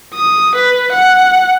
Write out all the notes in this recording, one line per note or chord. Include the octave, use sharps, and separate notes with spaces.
D#6
B4
F#5